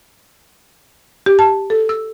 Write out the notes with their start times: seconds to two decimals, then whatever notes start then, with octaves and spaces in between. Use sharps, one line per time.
1.26 G4
1.39 A5
1.70 A4
1.89 E6